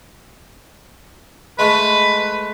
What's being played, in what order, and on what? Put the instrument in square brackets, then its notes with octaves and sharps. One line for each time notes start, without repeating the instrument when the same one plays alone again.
[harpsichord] G#3 A3 [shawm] B4